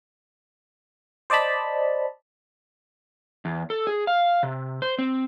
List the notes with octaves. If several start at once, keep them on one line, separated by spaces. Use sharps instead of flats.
C5 D5 D#5 A5 B5
E2
A4
G#4
F5
C3
C5
C4